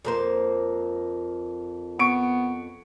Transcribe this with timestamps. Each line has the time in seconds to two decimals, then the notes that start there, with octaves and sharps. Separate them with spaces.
0.05 F2 A#3 C5
1.99 B3 C#6 D7